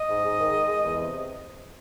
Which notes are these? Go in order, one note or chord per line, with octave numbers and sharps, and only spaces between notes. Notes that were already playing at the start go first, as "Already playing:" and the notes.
Already playing: D#5
G#2
G#2
D#3
G#3
G#3
E2
C3